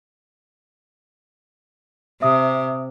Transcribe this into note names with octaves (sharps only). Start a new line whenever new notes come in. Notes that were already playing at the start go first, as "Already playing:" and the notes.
C3 E5 D#6